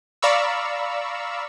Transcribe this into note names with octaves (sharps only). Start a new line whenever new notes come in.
D5 F5 A#5 B5 C#6 E6